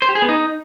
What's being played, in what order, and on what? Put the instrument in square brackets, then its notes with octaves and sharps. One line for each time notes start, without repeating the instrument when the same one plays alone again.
[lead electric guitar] C5
G4
G#4
B3
D#4